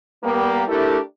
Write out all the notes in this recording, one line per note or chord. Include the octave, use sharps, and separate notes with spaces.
G3 A#3 B3
A3 D4 E4 G4 A4 A#4